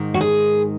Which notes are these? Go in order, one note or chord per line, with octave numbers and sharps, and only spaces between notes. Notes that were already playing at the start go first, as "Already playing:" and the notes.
Already playing: G#2 D#3
F#4
G#4